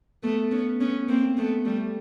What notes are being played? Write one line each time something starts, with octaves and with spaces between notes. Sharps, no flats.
A3 B3
B3 C#4
B3 C#4
A#3 C4
A3 B3
G3 A3